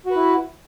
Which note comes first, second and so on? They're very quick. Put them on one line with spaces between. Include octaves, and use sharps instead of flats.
F#4 B4 E4